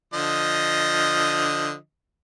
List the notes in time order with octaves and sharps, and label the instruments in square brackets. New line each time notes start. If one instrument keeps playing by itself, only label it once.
[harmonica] D3 F3 D#5